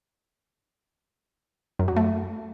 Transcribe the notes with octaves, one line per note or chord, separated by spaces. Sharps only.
F#2
F#3
A3